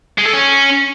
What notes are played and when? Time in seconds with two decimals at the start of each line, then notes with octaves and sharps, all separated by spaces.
0.18 G#3
0.26 A4
0.33 C#4